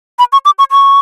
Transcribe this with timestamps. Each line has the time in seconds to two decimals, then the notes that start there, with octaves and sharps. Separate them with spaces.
0.19 B5
0.33 C#6
0.45 D6
0.59 C#6
0.71 C#6